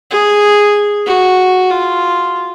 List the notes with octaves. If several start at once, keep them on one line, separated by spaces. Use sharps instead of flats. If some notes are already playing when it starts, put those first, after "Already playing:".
G#4
F#4
F4